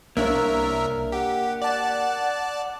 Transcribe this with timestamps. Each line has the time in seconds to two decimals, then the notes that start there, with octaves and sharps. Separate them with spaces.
0.17 C2 A#3 D4 A#4 C#5 E5
1.12 G4 F#5
1.62 D5 A5